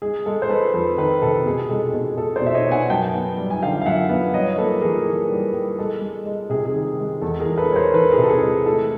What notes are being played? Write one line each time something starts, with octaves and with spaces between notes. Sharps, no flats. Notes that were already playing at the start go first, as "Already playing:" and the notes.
G#3 G#4
G#3 A4
C5
G#3 A4 B4
F2 A4 B4
D#3 A4 B4
C3 A4
B2 G#4
G#3 A4
B2
B2 A4
C5 D5
B2 E5
C#5 D#5
B3
F#5 G#5
F#2 G5 A5
B3
G3
G#5
D3 F5 G5
F5
F#2 E5 F#5
B3
G3 C#5 D#5
A#3 A4 B4
E3 G#4 A#4
E3
G3
G3
G#3 A4
G#3
G#3
C3 G#4
G#4
D#3
G#3
E2 A4
G#4 A#4
E2
A4 B4
G#3 C#5
A#4 C5
E3 A4 B4
G#4 A#4
C3
A4
G#4 A#4
G#3
A3 A4